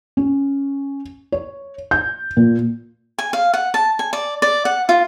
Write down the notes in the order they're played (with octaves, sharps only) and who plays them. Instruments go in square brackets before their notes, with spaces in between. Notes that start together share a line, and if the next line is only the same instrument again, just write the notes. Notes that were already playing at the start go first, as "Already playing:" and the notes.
[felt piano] C#4
C#5
G6
A#2
[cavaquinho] G#5
F5
F#5
A5
G#5
D5
D5
F#5
F4